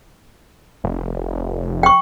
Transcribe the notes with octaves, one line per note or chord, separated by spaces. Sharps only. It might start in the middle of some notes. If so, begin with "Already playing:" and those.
F1
G5 C#6